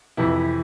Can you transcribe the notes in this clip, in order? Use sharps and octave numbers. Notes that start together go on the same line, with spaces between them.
F2 C3 E3 E4